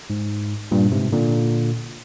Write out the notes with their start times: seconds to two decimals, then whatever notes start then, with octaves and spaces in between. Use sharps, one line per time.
0.10 G#2
0.71 G2 A#2
0.92 G#2 C3
1.13 A#2 D3